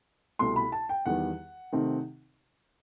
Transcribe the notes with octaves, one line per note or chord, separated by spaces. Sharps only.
C2 B2 A3 C6
B5
A5
G5
E2 D#3 G3 B3 F#5
C3 D#3 A3 C4 D#4